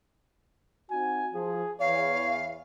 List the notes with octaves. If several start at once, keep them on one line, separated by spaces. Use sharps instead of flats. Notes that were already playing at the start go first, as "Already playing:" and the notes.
C4 D#4 F#4 G#5
F3 G#4
E2 C#5 F5